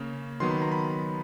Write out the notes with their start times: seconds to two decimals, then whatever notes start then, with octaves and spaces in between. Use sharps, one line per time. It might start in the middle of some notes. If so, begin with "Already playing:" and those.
Already playing: C#3 A#3 C#4
0.40 D#3 F#3 B3 C6
0.51 B5
0.62 A#5
0.72 B5